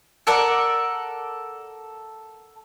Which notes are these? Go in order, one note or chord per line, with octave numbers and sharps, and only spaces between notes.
A4 A#4 D5 F#5